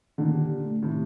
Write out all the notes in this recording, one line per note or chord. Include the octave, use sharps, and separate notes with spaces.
A#2 D3 D#3
G4
D4
A3
A2 C3 D#3